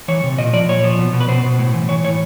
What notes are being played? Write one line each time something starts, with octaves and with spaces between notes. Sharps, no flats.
E3 C#5
C3
A#2 D#5
F3 D5
A#2 C#5
F3
B2
B2
B4
B2 C5
B2
A2
E3
E3 C#5
A2 C#5